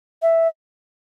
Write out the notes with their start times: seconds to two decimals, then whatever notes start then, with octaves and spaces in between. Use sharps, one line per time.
0.22 E5